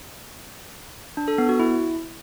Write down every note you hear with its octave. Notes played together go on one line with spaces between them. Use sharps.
D4
A4
B3
F#4
E4